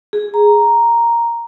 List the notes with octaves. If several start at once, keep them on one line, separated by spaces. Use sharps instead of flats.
G#4
A#5